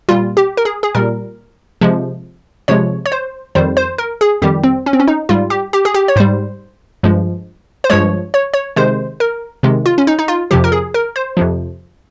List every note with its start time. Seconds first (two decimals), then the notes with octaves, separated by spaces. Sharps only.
0.09 A#2 G3 F4
0.37 G4
0.57 A#4
0.65 G#4
0.83 G#4
0.95 A#2 G3 A#4
1.81 C3 F3 G#3
2.68 C3 F3 G#3 C#5
3.06 C#5
3.12 C5
3.55 F2 D#3 G3 C5
3.77 C5
3.98 A#4
4.21 G#4
4.42 F2 D#3 G3 G4
4.64 C4
4.86 C#4
4.93 C4
5.00 C#4
5.07 D#4
5.29 G#2 G3 F4
5.50 G4
5.73 G4
5.85 G#4
5.94 G4
6.08 C#5
6.16 G#2 G3 C5
7.03 G2 F3 G#3
7.84 C5
7.90 G2 F3 G#3 C#5
8.34 C#5
8.54 C#5
8.76 C3 D#3 G#3 C5
9.20 A#4
9.63 C3 D#3 G#3
9.86 F4
9.98 C#4
10.07 D#4
10.19 D#4
10.28 F4
10.51 F2 C3 F3 G4
10.64 A#4
10.72 G#4
10.94 A#4
11.16 C5
11.37 F2 C3 F3